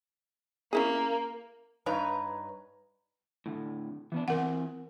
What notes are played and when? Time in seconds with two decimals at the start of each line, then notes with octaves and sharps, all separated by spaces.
0.73 A#3 C#4 E4 G#4
1.86 G2 D#4 B4 C#5 A#5
3.46 A2 D3
4.12 E3 B3 D4
4.28 E3 C4 A#4 F#5 G#5